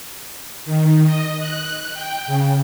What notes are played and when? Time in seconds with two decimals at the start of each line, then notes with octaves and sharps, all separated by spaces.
0.65 D#3
1.06 D#5
1.39 F#6
1.93 G5
2.27 C#3